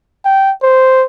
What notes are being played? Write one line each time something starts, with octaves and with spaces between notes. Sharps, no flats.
G5
C5